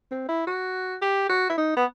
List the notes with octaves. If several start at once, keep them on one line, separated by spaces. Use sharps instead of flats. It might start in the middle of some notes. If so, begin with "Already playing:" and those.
C4
E4
F#4
G4
F#4
E4
D#4
B3